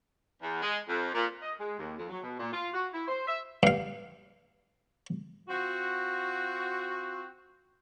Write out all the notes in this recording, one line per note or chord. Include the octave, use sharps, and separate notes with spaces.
E2
G#3
F2
A#2
D#5
G#3
D#2
F2
F#3
B2
A#2
F4
F#4
E4
C5
E5
G2 F5
C4 F4 F#4